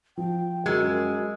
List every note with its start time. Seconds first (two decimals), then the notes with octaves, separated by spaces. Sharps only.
0.17 F3 G5
0.66 F#2 G#3 F#4 E6 G#6